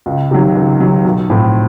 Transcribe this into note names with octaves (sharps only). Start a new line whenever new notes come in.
C#2
C3 D#3 F#3
C#2
C3 D#3 F#3
B1
A2 F3 A3 C4